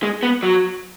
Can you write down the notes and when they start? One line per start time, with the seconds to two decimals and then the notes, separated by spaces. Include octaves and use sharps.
0.03 G#3
0.23 B3
0.43 F#3